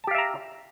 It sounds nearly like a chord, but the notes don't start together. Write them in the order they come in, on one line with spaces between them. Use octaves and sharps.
A5 G4 F5 E5 A#5